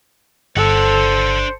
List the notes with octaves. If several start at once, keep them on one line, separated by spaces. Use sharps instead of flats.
G1 D4 A4 C5 F#5